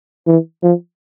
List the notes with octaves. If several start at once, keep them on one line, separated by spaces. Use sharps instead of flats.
E3
F3